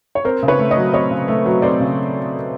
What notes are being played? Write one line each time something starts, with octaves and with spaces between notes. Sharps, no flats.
C#5
C4 A#4 C5
C#3
B4 C#5
A3
C#5 D#5
F#3
C4 C#5 D#5
C#3
A3
F#3
C4 C5 D5
C#3